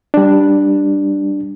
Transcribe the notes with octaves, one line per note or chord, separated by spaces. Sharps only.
G3 D4